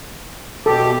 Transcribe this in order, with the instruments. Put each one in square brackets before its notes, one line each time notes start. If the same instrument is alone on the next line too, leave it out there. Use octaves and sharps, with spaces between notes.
[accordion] B2 G4 [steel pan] A4